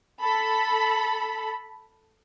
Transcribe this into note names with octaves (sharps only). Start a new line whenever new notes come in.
A4 B5